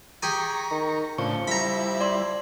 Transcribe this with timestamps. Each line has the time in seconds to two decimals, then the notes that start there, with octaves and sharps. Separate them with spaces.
0.22 G4 G#4 G#5 A#5 C#6
0.71 D#3
1.18 A2 C#3 F3 D4 C#6
1.47 G3 E4 A#5 B5
2.01 D5 C6